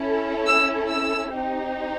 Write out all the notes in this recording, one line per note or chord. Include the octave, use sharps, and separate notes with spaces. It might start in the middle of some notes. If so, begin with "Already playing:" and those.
Already playing: C#4 E4 A4
E6
E6
C4 D#4 G4